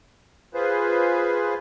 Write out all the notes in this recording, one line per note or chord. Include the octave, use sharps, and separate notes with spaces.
F4 G#4 B4 C5